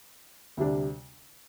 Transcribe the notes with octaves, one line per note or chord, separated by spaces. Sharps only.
D2 C3 G3 D4